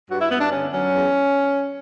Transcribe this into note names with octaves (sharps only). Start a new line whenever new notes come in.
G2 F#4
E4
G2 B3
D4
D3 C#4
F#3 C#4
E2